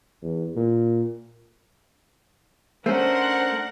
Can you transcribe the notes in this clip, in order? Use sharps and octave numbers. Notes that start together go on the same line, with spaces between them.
E2
A#2
A3 C#4 D4 A#4 C5 F#5